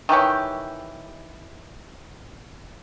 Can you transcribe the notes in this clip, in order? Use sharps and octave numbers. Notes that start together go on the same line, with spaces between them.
D#3 E3 G4 C#5